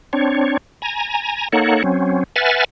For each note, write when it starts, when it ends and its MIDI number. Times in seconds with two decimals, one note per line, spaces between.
0.13 0.57 60
0.13 0.57 62
0.13 0.57 73
0.82 1.48 80
0.82 1.48 82
1.53 1.83 58
1.53 1.83 63
1.53 1.83 69
1.53 1.83 73
1.53 1.83 78
1.84 2.23 54
1.84 2.23 60
1.84 2.23 61
2.36 2.64 71
2.36 2.64 76
2.36 2.64 78
2.36 2.64 80
2.36 2.64 89
2.36 2.64 93